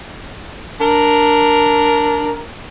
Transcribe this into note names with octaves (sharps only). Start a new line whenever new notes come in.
D4 A#4